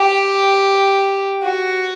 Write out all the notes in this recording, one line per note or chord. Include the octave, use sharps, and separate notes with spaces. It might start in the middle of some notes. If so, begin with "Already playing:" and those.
Already playing: G4
F#4